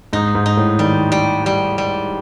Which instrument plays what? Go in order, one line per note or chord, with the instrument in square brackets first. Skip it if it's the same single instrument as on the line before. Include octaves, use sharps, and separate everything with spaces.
[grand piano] G#2 [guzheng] D#4
[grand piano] G#2
[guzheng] D#4
[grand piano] A2
[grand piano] D#3 [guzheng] G3
[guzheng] G3
G3
G3